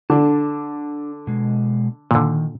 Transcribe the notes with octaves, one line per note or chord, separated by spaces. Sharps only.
D3 D4 A5
B2 G#3
A#2 D3 D#3